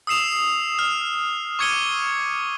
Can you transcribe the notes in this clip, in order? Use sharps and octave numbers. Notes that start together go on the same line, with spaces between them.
D#6 E6 C7 E7 F7
F6
C#6 D6 G#6 C#7 D#7 G7